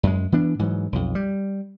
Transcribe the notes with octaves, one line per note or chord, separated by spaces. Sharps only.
F#2 G#3
E3 B3 D4
G#2 E3 F#3
B1 F2
G3